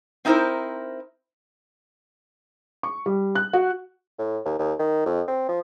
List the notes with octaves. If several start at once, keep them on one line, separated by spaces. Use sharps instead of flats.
C4 D#4 E4 G#4 A#4 C5
C#6
G3
F#6
F#4
A2
D#2
D#2
D#3
F2
C4
F3